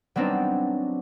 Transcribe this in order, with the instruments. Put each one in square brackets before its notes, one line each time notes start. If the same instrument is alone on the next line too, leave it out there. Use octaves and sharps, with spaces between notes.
[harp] F#3 G3 B3 C4 D4 D#4